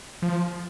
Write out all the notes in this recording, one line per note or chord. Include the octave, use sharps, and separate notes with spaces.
F3